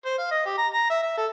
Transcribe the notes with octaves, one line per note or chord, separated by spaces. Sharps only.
C5
F5
D#5
G4
A#5
A#5
E5
E5
A4